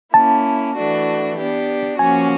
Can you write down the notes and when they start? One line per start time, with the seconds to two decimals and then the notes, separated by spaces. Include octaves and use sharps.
0.14 A#3 C#4 E4 A5
0.76 E3 A3 D4 F#4
1.37 B3 D4 G4
1.99 F3 A#3 C#4 F#4 G#5